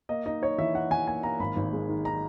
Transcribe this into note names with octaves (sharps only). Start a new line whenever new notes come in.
A#3 D#5
D#4 D#5
D#4 C#5
E3 E5
D#4 F#5
E3 G#5
A#3 G#5
A#3 A#5
G#1 B5
G#1
G#3
D#3
D#3 A#5